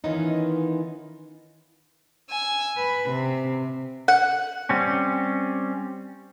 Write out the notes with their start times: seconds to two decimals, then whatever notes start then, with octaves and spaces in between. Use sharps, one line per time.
0.04 D#3 E3 B3 C#4 D#4 F4
2.30 G#5 E6
2.77 B4
3.10 C3
4.08 F#5
4.69 G3 C4 C#4